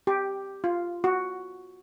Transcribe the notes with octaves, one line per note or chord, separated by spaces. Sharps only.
G4
F4
F#4